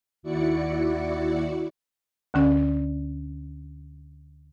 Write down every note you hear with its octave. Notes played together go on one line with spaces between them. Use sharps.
D#2 E4 F#4 D5 C#7
D2 D3 C#4 D5